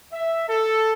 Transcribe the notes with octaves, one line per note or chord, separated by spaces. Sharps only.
E5
A4